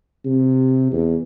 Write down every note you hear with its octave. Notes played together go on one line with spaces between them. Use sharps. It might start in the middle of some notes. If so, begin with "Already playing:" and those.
C3
E2